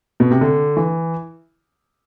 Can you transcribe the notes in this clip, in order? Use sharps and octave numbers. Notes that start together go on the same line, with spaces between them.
B2
C3
D3
E3